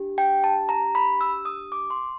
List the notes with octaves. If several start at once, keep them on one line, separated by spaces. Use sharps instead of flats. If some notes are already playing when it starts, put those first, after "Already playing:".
Already playing: D4 G4
G5
A5
A#5
B5
E6
D#6
D6
C6